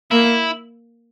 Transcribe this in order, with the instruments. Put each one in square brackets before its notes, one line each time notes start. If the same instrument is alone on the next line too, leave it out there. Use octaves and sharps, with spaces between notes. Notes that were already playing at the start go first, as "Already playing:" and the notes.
[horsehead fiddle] A#3 [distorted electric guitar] E4